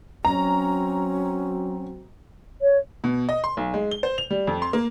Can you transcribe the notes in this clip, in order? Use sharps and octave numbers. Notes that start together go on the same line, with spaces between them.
F#3 C4 C#4 F#4 A#5
C#5
B2
D#5
C6
B1
G#3
G7
C5
F7
G3
F2
C6
A#3